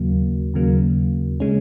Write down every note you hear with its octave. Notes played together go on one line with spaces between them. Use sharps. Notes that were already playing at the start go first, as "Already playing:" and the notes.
Already playing: D#2 C#3 F#3 A#3
D#2 C#3 F#3 A#3
C#3 G#3 C#4